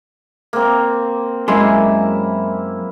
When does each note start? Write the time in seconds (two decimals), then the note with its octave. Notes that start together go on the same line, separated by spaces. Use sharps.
0.53 A#3 C4
1.48 F#2 G#3 A#3 E4 C6